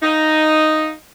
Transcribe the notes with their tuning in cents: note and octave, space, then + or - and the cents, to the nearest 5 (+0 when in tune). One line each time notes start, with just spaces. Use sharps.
D#4 +0 F5 -5